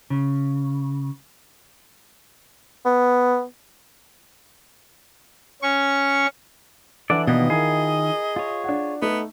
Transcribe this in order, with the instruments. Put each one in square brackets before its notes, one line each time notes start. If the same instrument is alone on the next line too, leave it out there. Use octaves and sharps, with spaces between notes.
[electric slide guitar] C#3
[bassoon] B3
[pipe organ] C#4 C#6
[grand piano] E3 D4 [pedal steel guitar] A4 E5 F#5 [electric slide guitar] D5
[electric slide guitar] B2 A#3 B3 [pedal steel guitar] D#3 F4 [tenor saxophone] D#5
[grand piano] E4 A#4 [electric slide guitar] G#4
[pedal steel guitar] F4 C#5
[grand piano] D4 F#5
[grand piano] A3 D#4 [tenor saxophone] B3